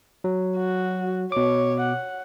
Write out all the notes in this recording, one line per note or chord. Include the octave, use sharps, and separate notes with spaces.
F#3
F#4
B2 C#5 D6
F#5